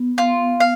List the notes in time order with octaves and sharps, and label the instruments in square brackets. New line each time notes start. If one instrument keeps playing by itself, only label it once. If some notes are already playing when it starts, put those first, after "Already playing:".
Already playing: [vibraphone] B3
[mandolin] F4
F5